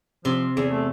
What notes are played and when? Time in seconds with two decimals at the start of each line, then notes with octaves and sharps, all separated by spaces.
0.25 C3 F3 C6
0.57 E2 G#4
0.71 A3